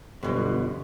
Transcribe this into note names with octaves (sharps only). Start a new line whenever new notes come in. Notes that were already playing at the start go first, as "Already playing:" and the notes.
G1 F#2 B2 F3